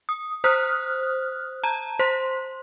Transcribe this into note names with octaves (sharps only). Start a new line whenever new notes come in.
D#6
C5 D#6 F6 F#6
A5 A#5
C5 C6